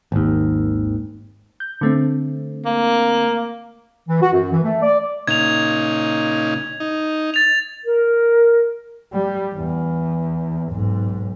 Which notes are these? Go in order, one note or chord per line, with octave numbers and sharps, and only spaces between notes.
G#1 D#2
G6
D3 A3 C4
A#3
E3
F#4
F#2
E3
A3
D5
A#2 C#3 D#4 G#6 F7
D#4
A6 F7
A#4
G3
E2
B1 G#2